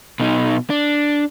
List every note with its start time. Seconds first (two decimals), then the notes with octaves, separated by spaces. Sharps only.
0.20 B2 D#4
0.70 D4